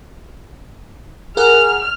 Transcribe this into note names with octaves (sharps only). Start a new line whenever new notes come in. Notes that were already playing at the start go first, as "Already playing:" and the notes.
G#4 A#4 F#5 F6